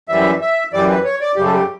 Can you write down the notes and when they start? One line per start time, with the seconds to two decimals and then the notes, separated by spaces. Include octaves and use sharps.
0.09 F#2 E3 G3 E5
0.41 E5
0.73 F#2 E3 G3 D5
0.89 B4
1.04 C#5
1.21 D5
1.36 F#2 C#3 G3 G4
1.44 A4
1.52 G4